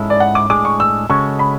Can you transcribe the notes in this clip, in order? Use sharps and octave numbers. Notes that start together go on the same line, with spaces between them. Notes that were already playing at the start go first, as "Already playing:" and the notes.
Already playing: G#2 G#3 C#4 E4 A4
D5
F#5
D6
A2 G#3 D4 G#4 D6
C#6
E6
C#3 G#3 C#4 F#4 A4 C#6
B5